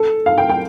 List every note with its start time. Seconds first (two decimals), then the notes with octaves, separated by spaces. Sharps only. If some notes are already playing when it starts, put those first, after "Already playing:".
Already playing: A4
0.26 F5
0.38 G5
0.50 G5